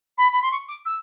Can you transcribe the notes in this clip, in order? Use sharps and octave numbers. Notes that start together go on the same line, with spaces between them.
B5
B5
C6
C#6
D6
E6